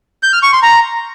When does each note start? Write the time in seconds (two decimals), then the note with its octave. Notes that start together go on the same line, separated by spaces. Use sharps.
0.23 G6
0.33 F6
0.43 C#6
0.53 C6
0.63 A#5